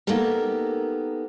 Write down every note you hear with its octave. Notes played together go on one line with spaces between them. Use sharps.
A#3 B3 D#4 G4 A4 A#4